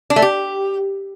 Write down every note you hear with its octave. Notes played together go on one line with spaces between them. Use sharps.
D4
A3
G4